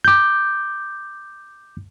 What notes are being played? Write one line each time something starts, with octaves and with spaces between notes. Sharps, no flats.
D6 G6